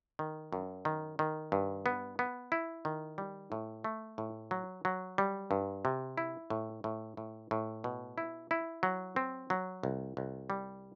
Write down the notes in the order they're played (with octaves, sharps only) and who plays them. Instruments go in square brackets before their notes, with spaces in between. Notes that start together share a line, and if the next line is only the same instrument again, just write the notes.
[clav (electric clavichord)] D#3
F#2
D#3
D#3
G2
B3
B3
E4
D#3
G3
A2
A3
A2
F#3
F#3
G3
G2
C3
E4
A2
A2
A2
A2
B2
E4
E4
F#3
C4
F#3
C2
C2
G3